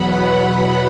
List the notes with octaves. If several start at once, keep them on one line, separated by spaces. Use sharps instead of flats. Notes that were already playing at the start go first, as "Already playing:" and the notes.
Already playing: E2 B2 F#3 B3 F#5 B5